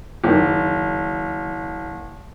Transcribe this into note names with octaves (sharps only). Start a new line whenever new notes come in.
F#1 D#3